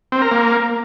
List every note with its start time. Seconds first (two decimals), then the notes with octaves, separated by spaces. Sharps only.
0.12 C4
0.22 A#4
0.31 A#3